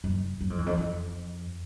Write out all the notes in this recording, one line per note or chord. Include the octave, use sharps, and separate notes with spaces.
F#2
F#2
F2
E2
F2
F2